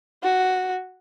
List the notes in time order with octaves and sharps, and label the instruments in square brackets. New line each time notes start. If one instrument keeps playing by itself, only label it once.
[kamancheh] F#4